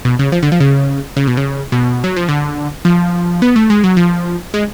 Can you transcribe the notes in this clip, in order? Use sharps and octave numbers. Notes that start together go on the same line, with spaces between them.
B2
C#3
F3
D3
F3
C#3
C#3
B2
C#3
B2
F#3
F3
D3
F3
B3
A3
G#3
F#3
F3
G#3